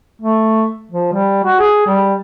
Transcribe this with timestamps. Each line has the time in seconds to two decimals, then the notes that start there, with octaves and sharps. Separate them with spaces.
0.22 A3
0.92 F3
1.13 G3
1.44 F#4
1.60 G#4
1.87 G3